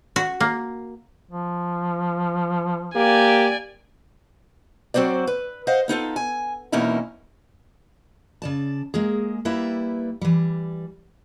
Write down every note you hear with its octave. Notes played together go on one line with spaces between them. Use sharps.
F#4
A#3
F3
A#3 G4 D5 G#5
F#3 C4 F#4 C5 D5
B4
C5 D#5 F5 F#5
B3 D#4 F4 A4
G#5
E2 B2 A#3 C#4 D#4 E4
C#3 D5 A5
G#3 A#3 G#4
G3 A#3 E4 B4 E5
E3 G3